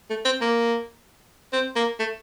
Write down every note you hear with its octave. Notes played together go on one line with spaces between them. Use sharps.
A3
C4
A#3
C4
A#3
A3